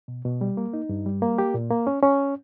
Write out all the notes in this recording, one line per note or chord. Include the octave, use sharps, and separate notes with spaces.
B2
B2
G3
A#3
D#4
G2
G3
A#3
G4
A#2
A#3
C#4
C#4